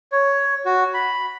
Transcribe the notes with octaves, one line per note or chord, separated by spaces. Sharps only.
C#5
F#4
B5